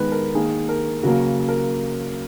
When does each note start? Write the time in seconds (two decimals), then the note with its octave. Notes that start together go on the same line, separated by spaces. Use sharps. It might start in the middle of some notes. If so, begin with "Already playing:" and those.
Already playing: D#3 G#3 B3 B4
0.12 A#4
0.35 D#3 A#3 G#4
0.69 A#4
1.03 C#3 F#3 A#3 F#4
1.49 A#4